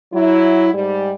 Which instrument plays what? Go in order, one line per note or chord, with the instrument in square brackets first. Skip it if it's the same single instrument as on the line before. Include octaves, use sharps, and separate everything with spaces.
[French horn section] F#3 E4
G#2 G3